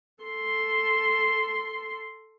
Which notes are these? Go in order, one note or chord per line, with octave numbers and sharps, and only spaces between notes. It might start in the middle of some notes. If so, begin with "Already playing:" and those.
A4 C6